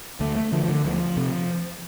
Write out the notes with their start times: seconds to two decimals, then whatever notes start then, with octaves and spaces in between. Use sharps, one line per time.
0.20 D2 A3
0.36 A3
0.52 D3 F3
0.64 F3
0.69 D3
0.85 D2 F3
1.17 C3